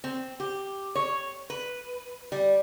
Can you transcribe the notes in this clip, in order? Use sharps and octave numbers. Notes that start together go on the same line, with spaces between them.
C4
G4
C#5
B4
G3